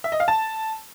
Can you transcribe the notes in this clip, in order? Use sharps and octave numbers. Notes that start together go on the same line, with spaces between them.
E5
D#5
F5
A5